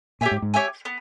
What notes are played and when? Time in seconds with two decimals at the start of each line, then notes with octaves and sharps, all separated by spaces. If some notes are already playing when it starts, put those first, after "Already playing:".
0.21 A#2 G4 C#5 E5 G#5
0.31 G#2
0.42 G#2
0.54 G4 C#5 E5 G#5
0.85 B3